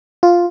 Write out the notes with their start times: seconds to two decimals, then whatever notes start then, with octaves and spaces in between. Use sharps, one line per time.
0.23 F4